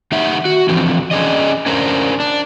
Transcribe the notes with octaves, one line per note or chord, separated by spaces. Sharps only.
D#3 D#4 E5 F#5
F#4
D3 E3 F3 C4
C#4 D4 G#4 D5 D#5
C#4 D4 A#4 C5
D4